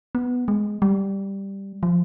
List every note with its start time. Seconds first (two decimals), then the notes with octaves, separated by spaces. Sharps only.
0.15 B3
0.48 G#3
0.82 G3
1.83 F3